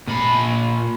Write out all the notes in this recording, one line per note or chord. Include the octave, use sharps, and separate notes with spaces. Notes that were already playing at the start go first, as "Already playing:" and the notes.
A#2 B5